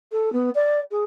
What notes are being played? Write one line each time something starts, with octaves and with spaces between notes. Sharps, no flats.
A4
B3
D5
G#4